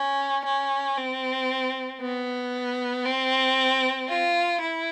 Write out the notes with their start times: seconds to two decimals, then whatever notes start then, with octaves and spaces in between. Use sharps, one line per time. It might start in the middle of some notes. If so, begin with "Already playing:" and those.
Already playing: C#4
0.45 C#4
0.97 C4
2.01 B3
3.05 C4
4.09 F4
4.61 E4